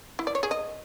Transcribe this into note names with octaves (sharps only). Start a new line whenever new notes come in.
E4
D5
C#5
G#4
D#5